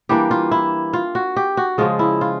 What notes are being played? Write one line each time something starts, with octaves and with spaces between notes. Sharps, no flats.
E3 G3 A#3 D4 G4
F4
E4
F4
F#4
G4
F#4
C#3 F3 G#3 F4
E4
F4